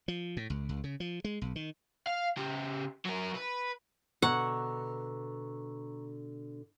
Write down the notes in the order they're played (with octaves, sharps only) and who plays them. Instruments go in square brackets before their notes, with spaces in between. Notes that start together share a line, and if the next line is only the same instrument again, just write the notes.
[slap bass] F3
A2
C#2
C#2
C#3
F3
G#3
B1
D#3
[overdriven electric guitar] F5
C#3 G4
F#3 A#4
B4
[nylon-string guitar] B2 D3 G#5 [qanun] F#5 [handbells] A#5 C#6 E6